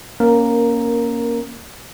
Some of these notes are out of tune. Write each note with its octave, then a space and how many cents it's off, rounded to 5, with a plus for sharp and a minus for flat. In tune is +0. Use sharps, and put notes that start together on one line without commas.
A#3 +10 C#4 +0 A#4 +0